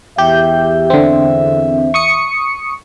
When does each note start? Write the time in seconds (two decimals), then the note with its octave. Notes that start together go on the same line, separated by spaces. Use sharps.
0.18 E2 G4 E5 G6
0.90 D3 C4
1.94 C#6 D#6 C#7